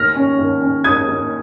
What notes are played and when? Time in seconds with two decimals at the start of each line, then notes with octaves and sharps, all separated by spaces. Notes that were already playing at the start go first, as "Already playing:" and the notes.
Already playing: D#2 F6 A#6
0.15 C#4
0.39 D#2
0.62 C#4
0.84 D#2 D#6 G#6
1.08 D#2